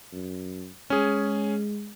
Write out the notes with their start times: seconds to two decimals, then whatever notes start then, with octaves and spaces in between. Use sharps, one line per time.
0.13 F#2
0.90 G#3 C#4 G#4